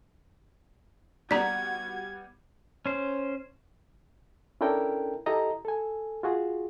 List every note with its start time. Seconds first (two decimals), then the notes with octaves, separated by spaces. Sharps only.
1.31 G3 B3 F#4 D5 A#5 G#6
2.86 C#4 C5
4.61 C#4 D4 E4 A4 A#4 G5
5.26 E4 G4 A4 D#5 A#5
5.65 A4 G#5
6.23 F4 F#4 G#4